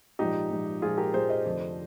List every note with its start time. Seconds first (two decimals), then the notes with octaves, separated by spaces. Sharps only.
0.19 A#1 G#2 F3 D#4 G4
0.51 A#1 G#2 F3
0.82 A#1 G#2 F3 F4 G#4
0.98 G4 A#4
1.14 A#1 G#2 F3 G#4 C5
1.29 C5 D#5
1.45 F1 F2 D3 F3